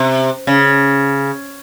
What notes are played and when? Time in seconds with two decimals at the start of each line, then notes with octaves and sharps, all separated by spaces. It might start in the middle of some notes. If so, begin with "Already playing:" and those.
Already playing: C3
0.47 C#3